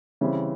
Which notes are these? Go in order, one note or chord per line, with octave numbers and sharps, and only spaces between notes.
C#3 E3 G3 C4